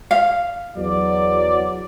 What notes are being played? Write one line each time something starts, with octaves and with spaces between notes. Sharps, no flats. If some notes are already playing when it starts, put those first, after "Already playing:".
F5
E2 F#3 D5